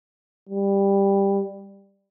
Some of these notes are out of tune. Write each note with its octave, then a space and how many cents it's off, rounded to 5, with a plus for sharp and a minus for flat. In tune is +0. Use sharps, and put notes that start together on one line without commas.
G3 +10